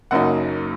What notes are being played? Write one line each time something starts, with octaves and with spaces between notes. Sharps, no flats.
F#1 F#2 F#3 A#3 D#4 F#5